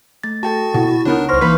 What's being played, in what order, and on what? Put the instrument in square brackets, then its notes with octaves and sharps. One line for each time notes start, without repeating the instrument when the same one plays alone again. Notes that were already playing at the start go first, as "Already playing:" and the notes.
[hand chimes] A3 A6
[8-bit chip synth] F#4 A6 [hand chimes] A4 G5 A5
[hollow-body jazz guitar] B2 [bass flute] E4
[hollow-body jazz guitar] C#2 B3 D#4 [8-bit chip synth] D4 A#4 [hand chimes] C#5
[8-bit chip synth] C2 A#6 [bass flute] C5 [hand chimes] C6 C#6 F6
[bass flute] E3 [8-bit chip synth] A#3 D#4 [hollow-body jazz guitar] B4 B5